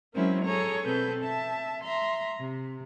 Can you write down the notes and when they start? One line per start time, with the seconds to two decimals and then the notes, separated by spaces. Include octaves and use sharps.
0.14 F#3 G#3 C4 C#4 E4 A#4
0.44 G#4 A4 C#5 A#5
0.85 B2 C4 A4 B4 G6
1.22 E5 A5
1.83 E5 A#5 C6
2.38 C3